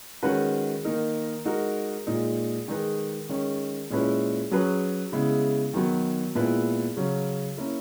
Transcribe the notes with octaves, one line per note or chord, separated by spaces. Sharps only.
D#3 G#3 C#4 F#4 B4
D#3 A#3 D#4 A#4
G#3 D#4 F#4 A#4
A#2 G#3 D#4
D#3 G#3 D#4 G#4 B4
D#3 G#3 C#4
A#2 G#3 C#4 E4 B4
F#3 C#4 G#4 B4
C#3 G#3 B3 E4
D#3 F#3 B3
A#2 G#3 B3 E4 B4
C#3 F#3 C#4
A#3 C#4 E4 A#4